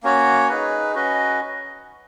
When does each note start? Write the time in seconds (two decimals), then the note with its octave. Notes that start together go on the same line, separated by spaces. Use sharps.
0.03 A#3 C#4 F#4 C#5
0.49 D#4 G#4 B4
0.95 C#4 F#4 B4 D#5